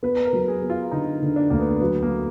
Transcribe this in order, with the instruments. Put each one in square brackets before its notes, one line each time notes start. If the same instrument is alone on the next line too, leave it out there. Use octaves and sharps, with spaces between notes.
[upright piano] B3 [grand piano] B4
[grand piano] B4
A#4
[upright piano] F#3
[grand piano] G#4
[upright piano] B3
[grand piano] F4
[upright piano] D3 [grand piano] D#4
[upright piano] D3
[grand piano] D4
[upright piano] D2 [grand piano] A#3
[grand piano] B3
[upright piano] F#3 [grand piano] B3
[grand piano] A#3